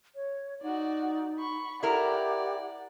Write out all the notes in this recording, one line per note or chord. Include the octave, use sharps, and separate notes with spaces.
C#5
D#4 F#4 D5
B5 C#6
E4 G4 A#4 D5 F#5